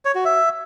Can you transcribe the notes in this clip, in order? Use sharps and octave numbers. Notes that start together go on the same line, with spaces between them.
C#5
F#4
E5